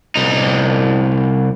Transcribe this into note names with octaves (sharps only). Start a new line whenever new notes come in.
C2 D#4